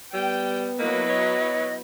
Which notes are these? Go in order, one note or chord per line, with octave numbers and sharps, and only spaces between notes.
G3 B3 G5
F#3 A#3 E4 B4 D#5
C#5